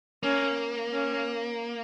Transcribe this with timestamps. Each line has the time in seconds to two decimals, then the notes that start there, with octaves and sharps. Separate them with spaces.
0.23 A#3 C#4
0.93 C#4